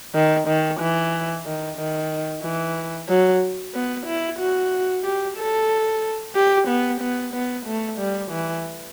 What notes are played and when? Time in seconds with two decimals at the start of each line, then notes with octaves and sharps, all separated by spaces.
0.14 D#3
0.47 D#3
0.80 E3
1.45 D#3
1.77 D#3
2.43 E3
3.08 F#3
3.74 B3
4.06 E4
4.39 F#4
5.04 G4
5.38 A4
6.35 G4
6.68 B3
7.01 B3
7.33 B3
7.66 A3
7.99 G3
8.31 E3